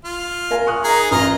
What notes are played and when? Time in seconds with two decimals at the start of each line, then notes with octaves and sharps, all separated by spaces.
0.04 F4
0.51 A#4 F5 G#5
0.67 C#6 D#6 F#6
0.84 D#4 G#4 A#4
1.11 A1 F4 A#4 D#5